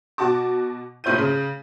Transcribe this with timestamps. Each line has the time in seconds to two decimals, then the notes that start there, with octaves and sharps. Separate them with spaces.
0.18 B2 F#4 A5 D6
1.04 F1 A#2 E4 C#5 G6 D#7
1.18 C#3